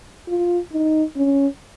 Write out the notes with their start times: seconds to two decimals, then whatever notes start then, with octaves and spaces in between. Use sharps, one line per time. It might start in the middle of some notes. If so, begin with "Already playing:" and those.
0.28 F4
0.72 D#4
1.16 C#4